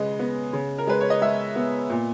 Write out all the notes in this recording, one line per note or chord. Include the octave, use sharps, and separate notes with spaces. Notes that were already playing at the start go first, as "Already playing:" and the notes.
Already playing: C#3 G#3 B4 D#5
B3
C#3
A#4
G#3 B4
C#5
D#5
G#3 E5
B3
A#2